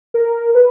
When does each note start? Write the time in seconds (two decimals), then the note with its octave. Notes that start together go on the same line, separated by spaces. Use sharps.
0.14 A#4
0.55 B4